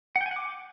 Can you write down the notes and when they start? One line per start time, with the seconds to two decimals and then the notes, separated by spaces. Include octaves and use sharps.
0.16 F#5
0.21 G5
0.26 G#5
0.31 F#5
0.36 D6